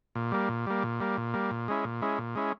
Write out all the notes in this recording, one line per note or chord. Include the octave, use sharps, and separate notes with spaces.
A#2
G3 A#3
A#2
G3 A#3
A#2
G3 A#3
A#2
G3 A#3
A#2
G#3 C#4 E4
A#2
G#3 C#4 E4
A#2
G#3 C#4 E4